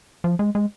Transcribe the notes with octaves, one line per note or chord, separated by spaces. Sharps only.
F3
G#3
G#3